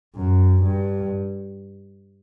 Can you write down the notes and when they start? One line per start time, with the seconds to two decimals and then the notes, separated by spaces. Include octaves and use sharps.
0.16 F#2
0.63 G2